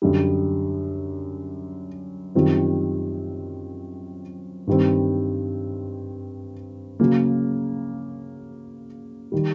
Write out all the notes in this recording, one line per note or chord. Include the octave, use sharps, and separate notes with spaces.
F#2 D3 G3
F#2 D#3 G3 C4 F4
G2 D#3 G3 C4
C#3 F#3 A#3
D#3 G3